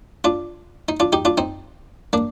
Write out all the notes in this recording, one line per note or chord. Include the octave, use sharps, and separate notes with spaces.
D4 F4
D#4
D4 F4
D#4 G4
D4 F4
C4 D#4
A#3 D4